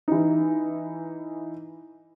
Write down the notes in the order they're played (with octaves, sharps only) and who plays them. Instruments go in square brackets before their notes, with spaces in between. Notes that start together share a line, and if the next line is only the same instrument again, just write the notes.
[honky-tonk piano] E3 D#4